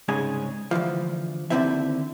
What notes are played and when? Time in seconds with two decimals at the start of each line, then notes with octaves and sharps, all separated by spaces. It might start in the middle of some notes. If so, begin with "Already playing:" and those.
0.08 C2 G#2 C#3 G#3 C#4 G#4
0.71 D2 G2 E3 F3
1.50 D#2 D3 A3 C4 E4 E5